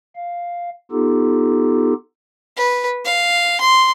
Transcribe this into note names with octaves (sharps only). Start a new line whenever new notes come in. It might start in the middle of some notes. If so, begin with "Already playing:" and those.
F5
B3 D#4 F4 G4 A4
B4
F5
C6